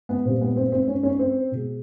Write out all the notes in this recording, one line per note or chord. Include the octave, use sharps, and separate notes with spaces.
B3
A#2 G3 C4
B3
C4
C4
C#4
C#4
C4
B2 G#3